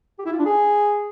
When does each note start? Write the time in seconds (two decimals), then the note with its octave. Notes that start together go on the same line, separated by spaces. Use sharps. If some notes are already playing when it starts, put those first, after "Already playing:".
0.19 G4
0.26 E4
0.32 F4
0.39 D4
0.46 G#4